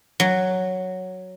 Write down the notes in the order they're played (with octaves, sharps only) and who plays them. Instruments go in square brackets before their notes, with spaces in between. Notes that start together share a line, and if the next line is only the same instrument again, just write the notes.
[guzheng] F#3